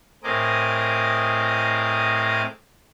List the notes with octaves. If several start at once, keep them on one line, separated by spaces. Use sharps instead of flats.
A2 C4 G#4 A#4 D#5 D6